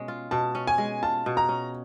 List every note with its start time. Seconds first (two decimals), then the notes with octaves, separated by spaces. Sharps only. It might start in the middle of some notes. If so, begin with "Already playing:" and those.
Already playing: B2 G#3 C#4
0.08 F4
0.31 B2 A5
0.55 C#4
0.67 G#5
0.78 G#3
1.03 F4 A5
1.26 B2
1.37 A#5
1.49 C#4